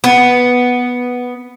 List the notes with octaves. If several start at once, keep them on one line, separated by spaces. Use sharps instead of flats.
B3